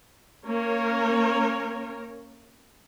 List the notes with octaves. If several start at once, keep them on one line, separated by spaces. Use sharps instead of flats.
A#3 C#4 A#4 C#5